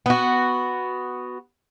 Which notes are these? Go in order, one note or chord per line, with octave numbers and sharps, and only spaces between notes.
B3 F#4